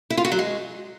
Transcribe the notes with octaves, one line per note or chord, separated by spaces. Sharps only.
E4
F4
F#4
F#3
G#3